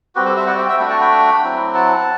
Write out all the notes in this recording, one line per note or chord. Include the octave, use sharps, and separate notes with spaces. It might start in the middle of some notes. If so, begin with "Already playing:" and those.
G3 C4 F#4 G4 B4
A4 C5
C5 E5
D5 F#5
E5 G5
E5 G5
A3 D4 F#4 G5 B5
F#5 A5
G5 B5
F#3 C4 E4
F#5 A5